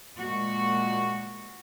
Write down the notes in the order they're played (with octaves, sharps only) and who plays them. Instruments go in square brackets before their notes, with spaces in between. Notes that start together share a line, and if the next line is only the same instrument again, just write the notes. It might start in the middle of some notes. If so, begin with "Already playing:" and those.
[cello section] A#2 G#3 F#4